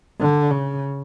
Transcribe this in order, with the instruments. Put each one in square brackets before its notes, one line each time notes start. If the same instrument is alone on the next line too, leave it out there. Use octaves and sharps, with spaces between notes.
[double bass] D3
C#3